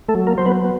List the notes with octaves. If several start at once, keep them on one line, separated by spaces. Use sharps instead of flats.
A3 A4
F#3
A#3 A#4
F#3 C5
B3 B4
B3